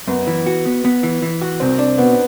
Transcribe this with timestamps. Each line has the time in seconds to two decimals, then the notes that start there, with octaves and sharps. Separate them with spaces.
0.07 F#2 B3
0.27 E3
0.46 F#4
0.66 B3
0.85 B3
1.03 E3
1.22 E3
1.42 F#4
1.60 C2 C4
1.79 D4
1.98 B2 B3